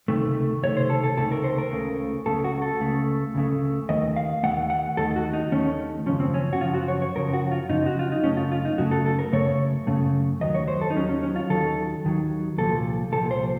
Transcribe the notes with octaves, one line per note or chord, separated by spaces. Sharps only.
C#2 C3 D#3 A3
C#2 C3 D#3 A3 C#5
C5
A4
A4
C#2 C3 D#3 A3 A4
A#4
C5
A#4
C#2 C#3 A3
C#2 C#3 A3 A4
F#4
A4
C#2 C#3 A3
C#2 C#3 A3
D#2 D#3 A3 D#5
F5
D#2 D#3 A3 F#5
F#5
D#2 D#3 A3 A4
F#4
D#4
D#2 D#3 A3 C#4
F#2 C#3 F3 C#4
C4
C#4
F#4
F#2 C#3 F3 F4
F#4
C#5
C#5
F#2 C#3 F3 A#4
F#4
F4
F#2 C#3 F3 D#4
F#4
F4
D#4
F#2 C#3 A3 C#4
F4
F4
D#4
F#2 C#3 A3 F#4
A4
A4
A#4
F#2 C#3 A3 C#5
F#2 C#3 A3
D#2 D#3 F#3 D#5
C#5
C5
A4
D#4
D#2 D#3 F#3 C#4
C#4
C#4
F4
D#2 D#3 F#3 A4
D#2 D#3 F#3
C2 A#2 F3 A4
C2 A#2 F3 A4
C5